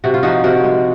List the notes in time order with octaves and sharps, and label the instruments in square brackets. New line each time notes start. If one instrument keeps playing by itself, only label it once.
[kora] C3 F#4
F4
F3 D#4 F#4
C3 F#4 A#4
G#3